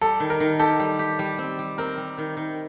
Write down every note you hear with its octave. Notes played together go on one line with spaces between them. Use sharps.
G3 A4
D#3
A#4
D#3
G4 A4
G3
G4
G3
C4
G3
C4 A#4
G3
D#3
D#3